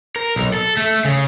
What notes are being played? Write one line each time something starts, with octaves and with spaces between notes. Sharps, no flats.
A#4
B1
A4
A3
C#3